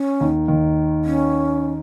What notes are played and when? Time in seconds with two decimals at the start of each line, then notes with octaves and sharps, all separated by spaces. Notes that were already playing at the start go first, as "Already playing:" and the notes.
Already playing: C#4
0.21 D#2 D#3
0.48 D#2 D#3
1.05 C#4